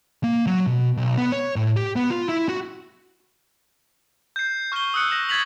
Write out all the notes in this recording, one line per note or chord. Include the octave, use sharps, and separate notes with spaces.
A#3
F#3
B2
B1
B3
C#5
A2
G4
B3
F4
E4
F#4
G6 C7
C#6 F6 G6 C7 D#7 G7
D#6 E6 F#6 C#7
A#6 E7
E6 G#6 A6 B6 F7 F#7